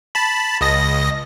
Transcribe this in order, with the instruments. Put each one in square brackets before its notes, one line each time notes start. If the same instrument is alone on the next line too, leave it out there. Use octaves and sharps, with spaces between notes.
[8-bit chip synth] A5 B5
C#2 D#5 A#6